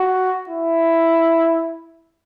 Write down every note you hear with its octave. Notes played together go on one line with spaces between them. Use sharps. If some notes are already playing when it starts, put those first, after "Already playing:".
Already playing: F#4
E4